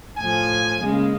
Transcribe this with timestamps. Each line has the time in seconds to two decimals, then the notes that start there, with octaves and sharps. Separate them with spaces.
0.17 A2 F3 G#5
0.81 C#3 G#3 A#3